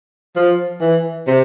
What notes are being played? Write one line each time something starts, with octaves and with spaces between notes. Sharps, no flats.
F3
E3
C3